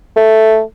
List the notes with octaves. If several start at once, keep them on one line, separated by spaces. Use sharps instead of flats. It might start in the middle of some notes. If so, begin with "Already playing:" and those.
A3